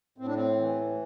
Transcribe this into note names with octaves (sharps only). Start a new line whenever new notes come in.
A2 C4
D4
C4
E3